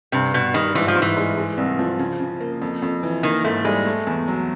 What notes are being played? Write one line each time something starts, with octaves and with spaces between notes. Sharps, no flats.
G2 C3
G2 B2
D#3 G3
G#2 E3
F3
G#2
E3
G#3
G#3
C2
F3
C#3
C#3
A#3
F2
F2
E3
D#3 A#3
G#2 A3
G3 G#3
A3
E2
F#3